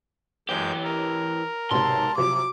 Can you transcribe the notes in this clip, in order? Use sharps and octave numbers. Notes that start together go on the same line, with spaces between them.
F#2 E3 G#3 G4 C#5 G6
A#4
B1 G#2 C3 A5 C6
C3 F3 F#3 D6